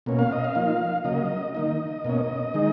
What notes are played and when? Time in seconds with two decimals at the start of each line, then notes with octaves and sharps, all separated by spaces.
0.06 B2 A#3 C#4
0.19 F5
0.32 D#5
0.44 F5
0.55 F3 A#3 D#4
1.04 C#3 F#3 A#3 D#5
1.54 D#3 A#3 D#4 D#5
2.05 B2 A#3 C#4
2.54 D#3 G#3 D#4